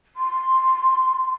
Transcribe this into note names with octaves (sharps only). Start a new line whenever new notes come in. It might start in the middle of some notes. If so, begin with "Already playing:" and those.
C6